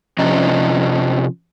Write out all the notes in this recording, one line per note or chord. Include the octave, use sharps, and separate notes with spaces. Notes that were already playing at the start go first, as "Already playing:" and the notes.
C3 F3 C#4 D4 D#5 A#5